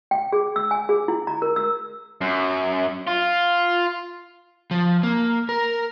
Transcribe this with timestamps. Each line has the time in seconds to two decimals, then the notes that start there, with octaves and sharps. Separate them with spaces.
0.11 G5
0.32 G#4
0.56 E6
0.71 G#5
0.89 G#4
1.08 E4
1.27 A#5
1.42 A#4
1.56 E6
2.21 F#2
3.08 F4
4.71 F3
5.03 A#3
5.49 A#4